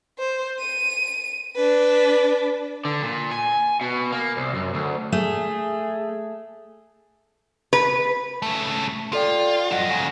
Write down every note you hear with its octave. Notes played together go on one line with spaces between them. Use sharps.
C5
D#7
D4 B4
D3
A#2
G#5
B2
A#3
C2
F#2
D2
A3 G#4
B4
C#3 A3
F4 A4 D5 G5
F3 F4 D#5 F#5 A#6
G#2 C#3